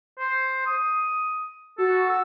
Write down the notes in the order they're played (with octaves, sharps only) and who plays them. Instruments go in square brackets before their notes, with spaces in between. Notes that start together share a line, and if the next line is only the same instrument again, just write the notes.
[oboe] C5
D#6
[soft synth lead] F#4 [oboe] A4
[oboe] E6